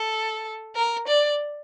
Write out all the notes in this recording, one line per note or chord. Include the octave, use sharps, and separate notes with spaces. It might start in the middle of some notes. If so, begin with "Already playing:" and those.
Already playing: A4
A#4
D5